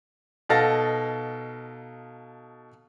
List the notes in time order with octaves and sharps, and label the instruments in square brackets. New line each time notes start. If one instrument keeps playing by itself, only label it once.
[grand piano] B2 D#4 A4 F5 A6 A#6